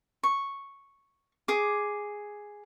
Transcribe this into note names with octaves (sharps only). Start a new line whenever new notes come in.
C#6
G#4 D6